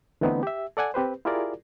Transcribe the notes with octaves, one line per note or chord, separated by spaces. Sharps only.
D3 E3 A3 B3 C4 D#4
G4 E5
A4 D5 F#5 G#5
C4 G4 B4 C5
E4 F4 G4 G#4 A#4 D5